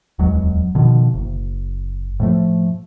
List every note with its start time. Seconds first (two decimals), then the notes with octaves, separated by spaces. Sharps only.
0.19 D1 E2 F#3 G#3
0.75 B2 D3 D#3 F3
1.14 F#1
2.20 A2 F3 A3